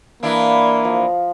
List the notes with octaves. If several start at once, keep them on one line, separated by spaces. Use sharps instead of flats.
E3 A#3 D4 E4 D#5 F5
F3 B5